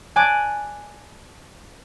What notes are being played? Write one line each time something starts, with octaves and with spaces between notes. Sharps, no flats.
D5 G#5 A5 D6 F#6